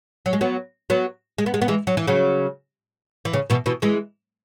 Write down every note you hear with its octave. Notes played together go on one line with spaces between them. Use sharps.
F#3
G#3
F#3 B3
F#3 B3
G#3
B3
G#3
B3
E3 G#3
F#3
E3
C#3 F#3
E3
C#3
B2 E3
B2 E3
E3 G#3